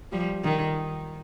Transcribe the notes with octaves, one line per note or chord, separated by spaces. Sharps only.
F3 G3
D#3